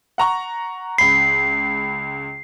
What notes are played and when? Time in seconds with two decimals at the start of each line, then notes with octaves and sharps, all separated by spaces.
0.18 F#5 A#5 C#6
0.98 C#2 B5 C7